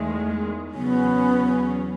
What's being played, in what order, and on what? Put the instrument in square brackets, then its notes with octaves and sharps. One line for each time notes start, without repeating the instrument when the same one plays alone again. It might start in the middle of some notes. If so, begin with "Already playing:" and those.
Already playing: [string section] E2 D#3 G#3 [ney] A3
[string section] E2 C#3 F#3 C#4 [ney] B3